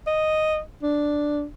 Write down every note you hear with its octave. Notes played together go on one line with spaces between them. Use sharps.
D#5
D4